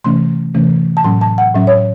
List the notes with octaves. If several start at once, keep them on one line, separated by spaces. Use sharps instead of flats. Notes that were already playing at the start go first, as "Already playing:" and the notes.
C3 E3 A3 C#4 C6
C3 E3 A3 C#4
A5
A2 F#3 C#4 C6
A5
F#5
A2 F#3 C#4 E5
C#5